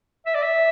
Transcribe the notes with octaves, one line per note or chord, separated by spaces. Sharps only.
E5
D5
E5